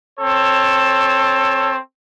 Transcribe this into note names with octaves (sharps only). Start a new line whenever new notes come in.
C4 A4 C#5